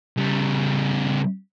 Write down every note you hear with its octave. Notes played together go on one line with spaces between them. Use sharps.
C#3 G3